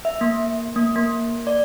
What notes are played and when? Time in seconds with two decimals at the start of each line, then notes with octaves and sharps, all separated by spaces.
0.05 E5
0.21 A#3
0.76 A#3
0.95 A#3
1.47 D5